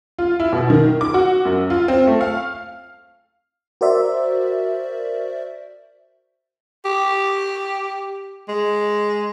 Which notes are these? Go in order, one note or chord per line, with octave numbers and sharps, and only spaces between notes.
F4
E4
B2
D#3
D6
F#4
F#2
F4
C4
A3
F5
F#4 A#4 C5 D5 E5
G4
G#3